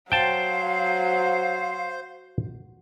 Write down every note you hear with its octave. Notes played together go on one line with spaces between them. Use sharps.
F#3 C5 F5 G5 A5